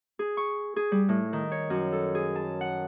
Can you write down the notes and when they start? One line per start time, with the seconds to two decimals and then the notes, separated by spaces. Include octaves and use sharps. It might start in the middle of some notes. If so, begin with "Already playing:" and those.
0.19 G#4
0.37 C#6
0.76 G#4
0.92 G3
1.09 A2
1.33 D#3
1.52 C#5
1.70 F#2
1.92 A4
2.15 G#4
2.36 A5
2.61 F#5